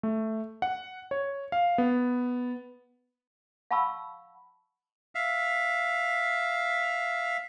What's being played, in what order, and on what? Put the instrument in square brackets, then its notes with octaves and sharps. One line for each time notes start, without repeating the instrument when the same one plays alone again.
[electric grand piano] A3
F#5
C#5
F5
B3
[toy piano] F5 F#5 A5 B5 C#6 E6
[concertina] E5 F5